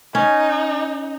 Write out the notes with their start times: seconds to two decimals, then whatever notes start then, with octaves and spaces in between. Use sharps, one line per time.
0.15 C#4 D#4